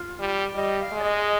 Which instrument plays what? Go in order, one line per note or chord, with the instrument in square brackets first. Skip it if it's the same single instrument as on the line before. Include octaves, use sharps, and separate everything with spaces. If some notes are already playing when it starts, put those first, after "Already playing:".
Already playing: [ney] F4
[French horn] G3
[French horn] G3 [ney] D#5
[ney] F5
[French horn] G#3
[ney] D5
D#5